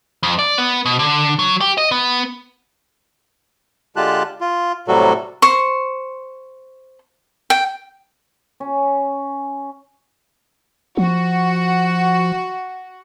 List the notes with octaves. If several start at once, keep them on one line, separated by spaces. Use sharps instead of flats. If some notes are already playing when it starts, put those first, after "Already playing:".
F2
D5
B3
B2
D3
F#3
G4
D#5
B3
D3 G#3 F4 G4 A5 F#6
F4
A2 C3 F#3 G3 F#4 A4
C5 C#6
G5
C#4
F3 F#4